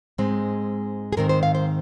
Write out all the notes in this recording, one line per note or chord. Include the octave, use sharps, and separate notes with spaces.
G#2 G#3 C4
G#4
G#2 D#3 C4 A#4
C5
F5
C5